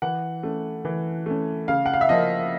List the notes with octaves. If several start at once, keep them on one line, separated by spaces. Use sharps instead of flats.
E3 F#5
A3 C#4
E3
A3 C#4
C#3 F5
F#5
F5
E5
F3 A#3 D#5